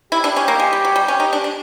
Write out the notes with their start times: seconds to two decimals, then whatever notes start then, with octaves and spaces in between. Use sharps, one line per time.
0.12 E4 G4
0.24 D4
0.36 C#4
0.48 A#3
0.60 G#3
0.73 G3
0.85 F#3
0.96 G3
1.08 C#4
1.20 D#4
1.33 D4
1.44 D4